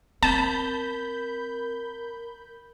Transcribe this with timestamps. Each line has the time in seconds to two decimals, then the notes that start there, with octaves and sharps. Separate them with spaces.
0.23 C4 A#4 A5 B5 G6